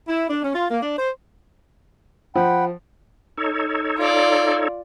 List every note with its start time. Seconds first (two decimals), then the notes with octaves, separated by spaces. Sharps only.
0.08 E4
0.30 D4
0.43 C#4
0.55 F4
0.71 A#3
0.82 D4
0.98 C5
2.35 F3 F#5 G5 B5
3.37 D#4 A4 C#5
3.98 F4 D5